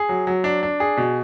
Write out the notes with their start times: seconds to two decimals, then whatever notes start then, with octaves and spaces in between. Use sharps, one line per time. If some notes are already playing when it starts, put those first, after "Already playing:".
Already playing: G#4
0.09 F#3
0.27 F#3
0.44 D4
0.63 D4
0.80 G#4
0.97 B2